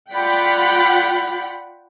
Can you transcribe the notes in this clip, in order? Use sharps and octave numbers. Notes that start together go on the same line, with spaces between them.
F4 D5 F#5 G5 B5